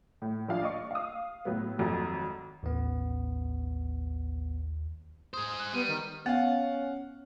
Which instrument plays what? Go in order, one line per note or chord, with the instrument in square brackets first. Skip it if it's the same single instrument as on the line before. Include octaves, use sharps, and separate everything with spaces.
[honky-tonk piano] A2
A#1 D4 F4 F5
D5 D#5 C#6
F5 D#6
A2 F#3 B3
G#1 F2 F#3 F#4 A#5
[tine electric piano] A1 B3 [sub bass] D#2
[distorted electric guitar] G#4 C5 [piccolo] D#6
[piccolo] F#6
[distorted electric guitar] G3 [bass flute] B3 [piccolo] D#7
[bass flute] D#3
[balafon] B3 [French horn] C#4 [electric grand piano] F5 F#5